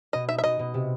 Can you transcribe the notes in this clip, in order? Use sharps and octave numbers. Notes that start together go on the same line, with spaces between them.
B2 D#5
D#4 E5
E5
B2 D#5
B2
C3